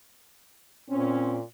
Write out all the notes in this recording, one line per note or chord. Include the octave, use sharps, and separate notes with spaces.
A#2 C4 C#4